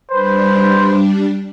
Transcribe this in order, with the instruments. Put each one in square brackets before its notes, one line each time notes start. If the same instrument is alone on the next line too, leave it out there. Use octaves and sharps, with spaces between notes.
[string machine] G3 D4 [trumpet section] B4 C5